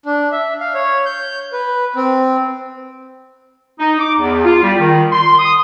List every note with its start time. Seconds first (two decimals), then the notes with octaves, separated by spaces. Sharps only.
0.06 D4
0.32 E5
0.60 F5
0.74 C#5
1.06 G6
1.53 B4
1.96 C4
3.79 D#4
3.99 D6
4.19 E2
4.45 F4
4.63 G3
4.79 D#3
5.12 C6
5.39 D#6